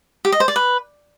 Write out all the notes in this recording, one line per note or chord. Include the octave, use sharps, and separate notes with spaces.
G4
D#5
C5
D5
B4